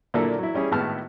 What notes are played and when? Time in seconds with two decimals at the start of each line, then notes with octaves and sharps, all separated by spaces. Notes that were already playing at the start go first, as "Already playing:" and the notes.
0.14 A#2 D3 F#3 A#3 E4 A4
0.39 F#3 E4
0.55 G3 C#4 E4 G#4
0.71 G#1 A2 B3 A5 F6